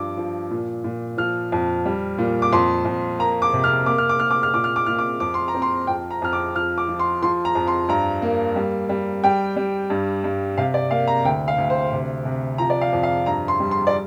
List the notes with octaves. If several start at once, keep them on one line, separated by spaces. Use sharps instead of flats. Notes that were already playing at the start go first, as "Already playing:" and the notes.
Already playing: G2 F3 D6
F3
A#2
A#2
F3 F6
F2
G3
A#2
D6
F2 C6
F2
A#3 A#5
D6
C3
F6
A#3 D6
F6
D6
A#3 F6
D6
F6
A#2 D6
F6
D6
A#2 F6
D6
F2 D6
C6
A#5
C4
C6
F2 G5
A#5
F2 F6
D6
F3 F6
D6
F3
C6
F3 C6
A#5
F2
C6
G2 A#5
A#3
G3
G3
G3 G5
G3
G2
G2
C3 F5
D5
A#3 F5
A#5
D2 G5
F5
D2
C5
C3
C3
F3 A#5
D5
F5
F2
F5
G2 A#5
C6
G3
C6
D5